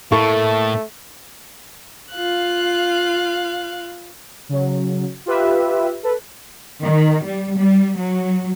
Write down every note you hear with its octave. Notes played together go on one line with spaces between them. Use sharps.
A2 A3 A#3 E4 A4 C#6
F4 F5 F#6
C#3 F#3
F4 G4 B4 E5
A4 B4
D#3
G3
G3
F#3